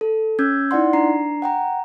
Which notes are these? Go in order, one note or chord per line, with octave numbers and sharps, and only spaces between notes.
A4
C#4 E6 G6 G#6
D#4 E4 D5 F#5 C6
D4 A#5 C7
F#5 G5 A#5